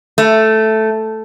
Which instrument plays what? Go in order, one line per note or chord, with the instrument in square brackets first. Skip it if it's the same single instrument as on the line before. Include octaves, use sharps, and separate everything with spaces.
[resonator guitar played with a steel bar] A3